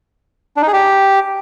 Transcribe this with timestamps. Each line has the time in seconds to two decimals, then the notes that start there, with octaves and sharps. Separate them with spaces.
0.57 D4
0.62 D#4
0.68 G#4
0.73 G4